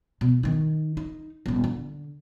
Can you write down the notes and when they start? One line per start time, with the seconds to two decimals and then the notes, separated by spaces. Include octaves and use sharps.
0.21 B2
0.43 D#3 D#4
0.97 D#4
1.46 D#1 B3
1.64 D3